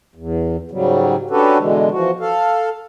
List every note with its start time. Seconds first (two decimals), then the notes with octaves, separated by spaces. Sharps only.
0.15 E2
0.71 G#2 C#3 F#3 G3
1.30 C#4 D4 F#4 G4 A4 B4
1.58 B2 D3 E3 G#3
1.91 E3 F3 F#4
2.20 A4 F5